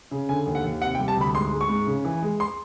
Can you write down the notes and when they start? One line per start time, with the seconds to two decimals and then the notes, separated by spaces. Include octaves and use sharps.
0.11 C#3
0.29 D3 G#5
0.47 D#2
0.55 F#5
0.64 D#2
0.81 C3 F#5
0.95 G5
0.99 G3
1.08 A5
1.17 D2 B5
1.34 G#2 C6
1.52 G#3
1.61 C#6
1.69 G#2
1.87 C#3
2.05 E3
2.22 G#3
2.40 C6